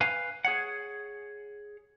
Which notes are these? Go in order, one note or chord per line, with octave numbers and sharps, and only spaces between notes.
B4 F5 G#5
G#4 C#5 F#5